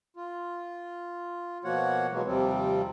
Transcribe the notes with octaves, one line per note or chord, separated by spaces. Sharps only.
F4
B2 F3 A#3 F#4 C#5 F#5
B2 E3 F#3 G#3 A#3
D#2 C3 F3 G3 C4